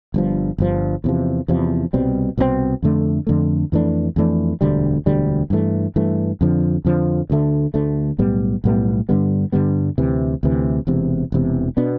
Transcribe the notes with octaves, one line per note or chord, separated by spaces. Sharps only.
G1 G2 F3
G1 G2 F3
E2 C3 F3
E2 C3 F3
C2 B2 G3 C4
C2 B2 G3 C4
F2 D3 A3
F2 D3 A3
F2 E3 A3 D4
F2 E3 A3 D4
E1 D2 D3 G3
E1 D2 D3 G3
G2 E3 A3
G2 E3 A3
F2 D3 F3
F2 D3 F3
D2 D3 A3
D2 D3 A3
B1 A2 G3 B3
B1 A2 G3 B3
G2 D3 G3 B3
G2 D3 G3 B3
D2 C3 E3
D2 C3 E3
E1 E2 C3
E1 E2 C3
B2 B3 D4